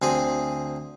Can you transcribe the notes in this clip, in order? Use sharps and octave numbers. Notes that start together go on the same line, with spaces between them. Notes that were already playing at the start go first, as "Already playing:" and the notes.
D2 C4 G#4